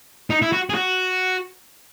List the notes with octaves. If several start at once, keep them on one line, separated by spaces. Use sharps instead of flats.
D#4
E4
F#4
G#4
F#4